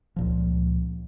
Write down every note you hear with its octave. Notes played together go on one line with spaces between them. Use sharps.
C#2 A#2 F3